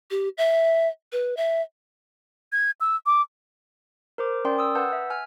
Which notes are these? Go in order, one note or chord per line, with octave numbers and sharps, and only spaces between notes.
G4
E5
B4
E5
G#6
E6
D6
A#4 C5 D6
C#4 A#4 D5 G5 C6
D#6 E6
B4 F#5 A5 E6 G6
E5
G#5 F6